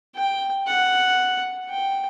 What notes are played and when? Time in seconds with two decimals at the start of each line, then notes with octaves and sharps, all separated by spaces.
0.15 G5
0.67 F#5
1.70 G5